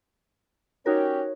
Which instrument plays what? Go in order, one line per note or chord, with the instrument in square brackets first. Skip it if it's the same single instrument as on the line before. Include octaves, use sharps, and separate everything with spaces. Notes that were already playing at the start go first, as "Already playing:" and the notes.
[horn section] C#4 G4 [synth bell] D#4 F#4 A#4 [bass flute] C#5